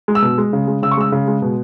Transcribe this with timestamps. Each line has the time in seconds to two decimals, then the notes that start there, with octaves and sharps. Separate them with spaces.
0.08 G#3
0.15 E6
0.22 B2
0.38 G#3
0.53 C#3
0.68 G#3
0.82 C#3 E6
0.91 C#6
0.97 G#3 E6
1.12 C#3
1.28 G#3
1.42 B2